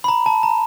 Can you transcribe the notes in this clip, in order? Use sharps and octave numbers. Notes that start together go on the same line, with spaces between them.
B5
A#5
A5
A#5